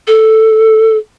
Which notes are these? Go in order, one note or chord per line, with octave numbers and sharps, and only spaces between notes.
A4